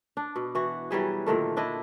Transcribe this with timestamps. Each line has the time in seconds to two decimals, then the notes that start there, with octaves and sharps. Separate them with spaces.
0.17 D4
0.36 B2
0.55 E3 F#4
0.91 E3 F#3 G3 G#4
1.26 A#2 D3 D#3 A3
1.56 D3 D4 E4 D#5